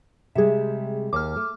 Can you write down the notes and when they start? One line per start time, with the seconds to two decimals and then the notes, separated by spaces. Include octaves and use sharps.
0.35 C3 G3 G#3 G#4 E5
1.13 D#2 D6 F6
1.36 A3